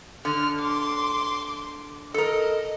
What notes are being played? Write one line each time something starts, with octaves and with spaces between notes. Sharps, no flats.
D3 F6
C6 D6
A4 A#4 D#5